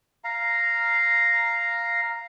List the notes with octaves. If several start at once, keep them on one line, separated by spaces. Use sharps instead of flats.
F5 A#5